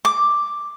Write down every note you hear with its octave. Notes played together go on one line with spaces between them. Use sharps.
D6